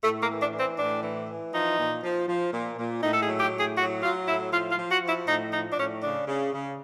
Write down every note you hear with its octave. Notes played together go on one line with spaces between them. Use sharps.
A2 A3
A#3
E3
D4
E3
C4
A2 D4
E3
E3
F3 D#4
A#2
F3
F3
A#2
A#2
A2 D#4
A4
G#4
F#3
G4
A2
G#4
F#3 F#4
F#3 F4
A2 E4
F3 F4
F4
F3
F#4
F3
E4
A2 D#4
F3 D#4
D4
A2 C#4
C#3 D4
C#3
C#3